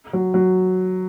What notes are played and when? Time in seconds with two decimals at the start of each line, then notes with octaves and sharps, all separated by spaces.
0.13 F#3
0.34 F#3